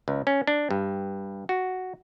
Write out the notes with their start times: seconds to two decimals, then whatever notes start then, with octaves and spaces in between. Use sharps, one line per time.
0.08 C#2
0.27 C#4
0.47 D4
0.71 G2
1.49 F#4